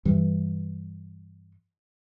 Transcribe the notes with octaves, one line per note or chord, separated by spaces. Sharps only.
G2 E3